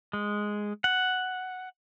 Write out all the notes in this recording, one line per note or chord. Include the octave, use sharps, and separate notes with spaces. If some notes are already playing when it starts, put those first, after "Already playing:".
G#3
F#5